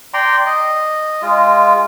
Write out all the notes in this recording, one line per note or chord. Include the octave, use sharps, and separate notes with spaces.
D5 G5 A#5 C6
D#5
G#3 F4